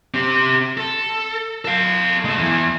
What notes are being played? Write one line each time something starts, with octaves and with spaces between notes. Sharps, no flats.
C4 G4
A4
A4 F5
G#3 A4
E2 E3